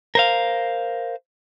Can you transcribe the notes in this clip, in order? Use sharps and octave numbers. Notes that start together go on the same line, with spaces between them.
A#4 C5 F5